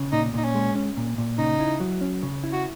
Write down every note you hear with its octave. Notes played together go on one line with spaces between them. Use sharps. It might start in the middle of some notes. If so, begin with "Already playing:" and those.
Already playing: C#3
A#2 D#4
A#2 D#4
C#4
G#3
C#4
A#2
A#2
C#3 D#4
E4
F#3
C#4
C#3
E4
F#4